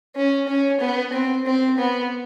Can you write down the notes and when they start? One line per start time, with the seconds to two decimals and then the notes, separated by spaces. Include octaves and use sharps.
0.16 C#4
0.48 C#4
0.80 B3
1.13 C4
1.46 C4
1.78 B3